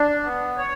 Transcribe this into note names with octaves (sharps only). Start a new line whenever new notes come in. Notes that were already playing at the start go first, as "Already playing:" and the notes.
Already playing: D4
B3
C#5